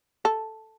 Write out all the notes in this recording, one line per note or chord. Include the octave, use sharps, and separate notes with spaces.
A4